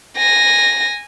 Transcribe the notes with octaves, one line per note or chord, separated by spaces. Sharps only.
G#5 A#6